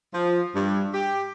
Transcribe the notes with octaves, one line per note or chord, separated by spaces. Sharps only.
F3
G2
G4